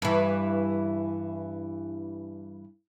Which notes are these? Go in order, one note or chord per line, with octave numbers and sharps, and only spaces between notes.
G2 E3